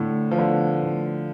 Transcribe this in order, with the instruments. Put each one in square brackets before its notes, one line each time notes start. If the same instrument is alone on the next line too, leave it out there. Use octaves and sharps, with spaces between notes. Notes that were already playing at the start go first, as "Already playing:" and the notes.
Already playing: [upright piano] A2 [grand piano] D3
[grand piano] F3
[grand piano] D3 [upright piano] B3
[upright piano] A2